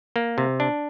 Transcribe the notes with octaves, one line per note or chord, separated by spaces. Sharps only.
A#3
C3
D4